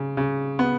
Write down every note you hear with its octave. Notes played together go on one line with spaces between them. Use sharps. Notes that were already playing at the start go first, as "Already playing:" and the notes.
Already playing: C#3
C#3
B3